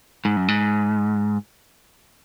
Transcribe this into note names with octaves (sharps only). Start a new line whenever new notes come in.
G#2
F#2
G#2